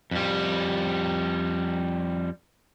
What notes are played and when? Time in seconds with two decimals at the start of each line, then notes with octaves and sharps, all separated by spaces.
0.11 F2 G3